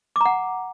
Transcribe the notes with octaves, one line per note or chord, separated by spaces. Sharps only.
F#5 A#5 D6